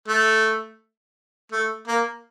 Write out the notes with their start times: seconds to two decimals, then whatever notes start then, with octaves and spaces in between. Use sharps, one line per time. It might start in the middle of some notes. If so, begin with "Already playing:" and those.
0.08 A3
1.52 A3
1.88 A#3